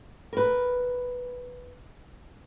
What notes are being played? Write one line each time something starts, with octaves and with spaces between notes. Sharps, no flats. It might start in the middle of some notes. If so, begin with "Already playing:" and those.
A#4 B4